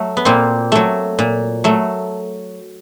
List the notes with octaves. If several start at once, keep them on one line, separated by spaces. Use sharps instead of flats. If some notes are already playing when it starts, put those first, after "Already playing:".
Already playing: F#3 A3
B3
A#2 A#3 C4
F#3 A3
A#2
F#3 A3